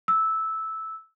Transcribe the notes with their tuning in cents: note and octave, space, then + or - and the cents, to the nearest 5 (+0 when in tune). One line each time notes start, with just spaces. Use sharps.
E6 -10